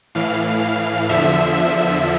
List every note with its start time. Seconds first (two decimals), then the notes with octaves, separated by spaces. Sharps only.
0.15 A2 E3 F5
0.62 F5
1.09 E2 D3 F3 E5